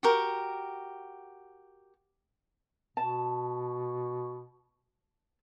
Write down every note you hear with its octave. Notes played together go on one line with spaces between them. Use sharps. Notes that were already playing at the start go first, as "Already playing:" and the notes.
F#4 G4 A#4
B2 A5